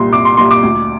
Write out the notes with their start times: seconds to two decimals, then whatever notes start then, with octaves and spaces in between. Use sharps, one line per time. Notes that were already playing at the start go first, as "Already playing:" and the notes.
Already playing: C2 A#2 G3 C6
0.12 C2 D6
0.25 C6
0.37 A#2 G3 C6
0.51 D6
0.63 D2